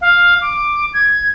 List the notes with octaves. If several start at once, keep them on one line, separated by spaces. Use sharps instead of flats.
F5
D6
G#6